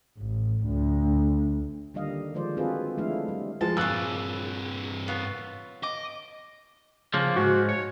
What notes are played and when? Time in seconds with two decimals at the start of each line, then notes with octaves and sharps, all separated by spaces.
0.18 A1
0.66 D2
1.94 D3 D#3 G3 A#3 D#5 F5
2.34 D#3 F3 G#3 C5 D5
2.57 C4 F4 F#4 G#4 A4 B4
2.97 F3 G#3 A3 D4 E4 F5
3.28 G3
3.61 F3 G#3 A5
3.77 G2 A#2 C#3 C4 E6 F#6
5.08 B3 C#4 F4
5.83 D#5 D6
7.14 C#3 F3 A#3
7.36 G#2 F#4
7.69 C#5